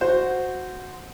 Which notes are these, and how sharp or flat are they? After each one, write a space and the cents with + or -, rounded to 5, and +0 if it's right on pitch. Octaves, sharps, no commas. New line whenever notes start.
F#4 -10 C5 -10